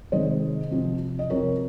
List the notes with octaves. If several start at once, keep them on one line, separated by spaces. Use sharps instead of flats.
C3 D#3 G#3 C5 D#5
C3 F3 C4
D#5
C3 F3 C4 A#4 C#5